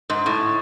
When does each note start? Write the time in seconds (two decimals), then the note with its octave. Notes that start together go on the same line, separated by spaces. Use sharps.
0.10 G#2
0.26 A2